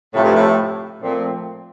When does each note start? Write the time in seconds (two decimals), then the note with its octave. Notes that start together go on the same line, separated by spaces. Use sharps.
0.14 A2 C3 F3 A3
0.24 G2
0.34 A2
1.02 A#2 F3 A3 C4